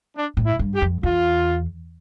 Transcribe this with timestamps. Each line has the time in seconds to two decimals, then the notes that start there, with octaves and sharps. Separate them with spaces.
0.15 D4
0.37 A2
0.45 E4
0.59 G2
0.74 G4
0.82 F2
1.03 E2 F4